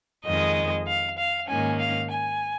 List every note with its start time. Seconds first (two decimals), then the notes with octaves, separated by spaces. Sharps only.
0.25 F2 D#3 G#3 D#5
0.87 F5
1.17 F5
1.48 G#2 D#3 A#3 C#4 G#5
1.79 F5
2.10 G#5